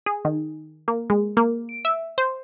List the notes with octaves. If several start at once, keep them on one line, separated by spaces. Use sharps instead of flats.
G#4
D#3
A#3
G#3
A#3
D7
E5
C5